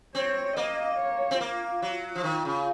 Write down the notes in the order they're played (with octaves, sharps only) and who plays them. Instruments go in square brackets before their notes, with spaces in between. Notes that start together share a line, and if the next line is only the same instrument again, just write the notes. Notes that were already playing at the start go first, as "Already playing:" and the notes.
[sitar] C4 [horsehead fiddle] C#5
[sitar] A#3 [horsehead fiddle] D#5
[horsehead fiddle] C#5
[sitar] C4
[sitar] A#3 [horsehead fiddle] F4
[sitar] F#3
F3
[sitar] D#3 [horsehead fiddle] F4
[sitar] C#3